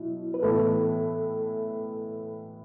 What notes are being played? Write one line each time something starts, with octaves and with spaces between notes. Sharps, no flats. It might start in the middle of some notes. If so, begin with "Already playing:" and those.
Already playing: B2 F#3 E4
B4
A2 E3 B3 E4 A4